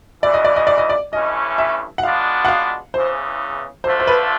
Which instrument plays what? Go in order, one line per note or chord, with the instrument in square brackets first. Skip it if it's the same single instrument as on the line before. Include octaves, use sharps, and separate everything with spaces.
[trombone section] E2 C#3 E3 [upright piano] D5
[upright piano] D#5
D5
D#5
D5
D#5
D5
[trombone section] G2 E3 A3 C#4 [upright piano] D#5
[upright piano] E5
F#5
[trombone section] B2 G#3 B3 D4 F4 [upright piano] F5
[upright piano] F#5
F5
[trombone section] E2 C#3 E3 [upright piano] C5
[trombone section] D3 F3 A3 D4 F4 [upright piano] C5
[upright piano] C5
B4